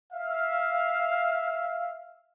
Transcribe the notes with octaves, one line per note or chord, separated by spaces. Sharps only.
E5 F5